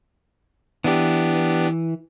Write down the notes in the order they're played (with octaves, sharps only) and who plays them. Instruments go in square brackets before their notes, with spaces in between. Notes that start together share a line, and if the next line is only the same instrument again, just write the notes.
[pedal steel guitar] E3 [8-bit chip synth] B3 D4 G4